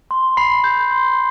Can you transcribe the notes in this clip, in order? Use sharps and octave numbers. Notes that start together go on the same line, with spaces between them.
C6
B5 C7
G6
C6